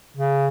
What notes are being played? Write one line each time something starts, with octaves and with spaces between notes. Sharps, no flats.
C#3